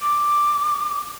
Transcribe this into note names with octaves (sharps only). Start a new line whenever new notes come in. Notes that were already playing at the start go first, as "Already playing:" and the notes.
D6